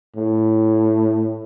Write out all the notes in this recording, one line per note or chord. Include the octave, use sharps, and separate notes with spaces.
A2